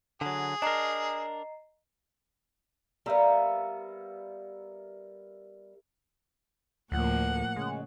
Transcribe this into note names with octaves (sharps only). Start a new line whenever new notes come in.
D3 F#3 G#4
D4 A#4 D#5 A#5 C7
G3 B3 A#4 E5 F5
D2 A2 F3 A#3 F#5
C#3 G#3